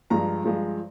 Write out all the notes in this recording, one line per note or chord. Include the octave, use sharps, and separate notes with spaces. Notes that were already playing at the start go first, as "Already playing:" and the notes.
G2 F3 G#3 A#5
G2 F3 G#3